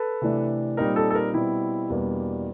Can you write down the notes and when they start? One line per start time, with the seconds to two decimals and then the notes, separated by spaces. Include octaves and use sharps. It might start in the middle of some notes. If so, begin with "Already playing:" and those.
Already playing: A4 B4
0.22 C3 E3 A3 D4
0.77 A#2 G3 C4 D#4 A#4
0.96 A4
1.11 A4
1.15 A#4
1.34 B2 G3 C4 E4
1.89 E2 B2 G3 A#3 D4